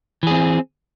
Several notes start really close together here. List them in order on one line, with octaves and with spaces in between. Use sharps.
E3 G#4 C4